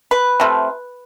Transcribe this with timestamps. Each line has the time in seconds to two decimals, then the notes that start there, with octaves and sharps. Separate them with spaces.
0.11 B4
0.40 C3 F3 A3